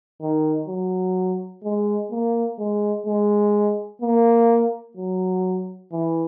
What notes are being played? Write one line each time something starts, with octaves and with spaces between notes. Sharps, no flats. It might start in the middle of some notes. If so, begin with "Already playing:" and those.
D#3
F#3
G#3
A#3
G#3
G#3
A#3
F#3
E3